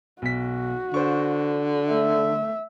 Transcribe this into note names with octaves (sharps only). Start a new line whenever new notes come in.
B1 F#4 B6
D3 C5 C#6
A3 E5